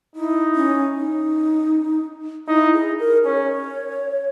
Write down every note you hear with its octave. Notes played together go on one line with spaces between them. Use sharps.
D#4 E4
C#4
D#4
D#4 E4
G#4
A#4
C#4 C#5